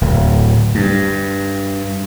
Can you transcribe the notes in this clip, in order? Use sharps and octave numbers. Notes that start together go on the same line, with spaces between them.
D1
G2